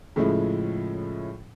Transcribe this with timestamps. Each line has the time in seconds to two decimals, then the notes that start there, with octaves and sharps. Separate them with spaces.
0.16 A2 C#3 F3 G#3 C#4 E4